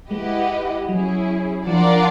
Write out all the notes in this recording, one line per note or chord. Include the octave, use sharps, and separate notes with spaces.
G#3 E4 G4 B4 D#5 F#5
F#3 C#4 E4 G#4
F3 D4 F4 A#4 D5 F#5